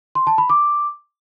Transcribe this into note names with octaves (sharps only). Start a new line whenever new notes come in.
C6
A5
B5
D6